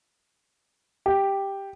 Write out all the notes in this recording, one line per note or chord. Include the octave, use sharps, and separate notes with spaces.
G4